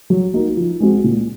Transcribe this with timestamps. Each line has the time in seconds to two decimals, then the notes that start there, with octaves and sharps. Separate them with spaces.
0.10 F#3
0.34 A#3 D#4 F#4
0.57 F3
0.80 G#3 C4 F#4
1.04 A#2